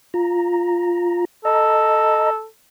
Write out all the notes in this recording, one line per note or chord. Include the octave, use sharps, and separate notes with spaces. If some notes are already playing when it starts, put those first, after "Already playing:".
F4 A#5
A4 D#5 A#5